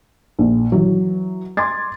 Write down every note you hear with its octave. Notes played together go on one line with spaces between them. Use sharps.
A#1
E3 F#3
C6 D6 G#6 A6